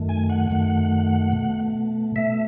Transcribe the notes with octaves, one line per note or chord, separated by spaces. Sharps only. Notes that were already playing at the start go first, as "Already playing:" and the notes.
Already playing: F#2 D#3 A3
G#5
F#5
F#2 D#3 A3
B2 A3
B2 A3 E5